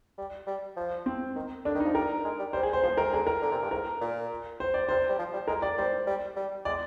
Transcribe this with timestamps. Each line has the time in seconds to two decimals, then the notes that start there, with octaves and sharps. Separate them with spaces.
0.18 G3
0.47 G3
0.76 F3
1.06 C4
1.36 D#3
1.65 D3 D4
1.75 D#3
1.80 D#4
1.85 F3
1.94 G3 A#4
2.24 G#3
2.39 G3
2.53 G3 C5
2.63 G#4
2.73 C5
2.83 F3 C5
2.97 D#3 A#4
3.12 D3 G#4
3.27 A#4
3.42 D3
3.52 C3
3.62 G2
3.71 G#2 A#4
4.01 A#2
4.60 C5
4.74 D5
4.89 C3 C5
5.09 G3
5.19 F3
5.33 G3
5.47 G#3 A#4
5.62 G3 D5
5.78 G3 C5
6.07 G3
6.36 G3
6.65 G#3 D5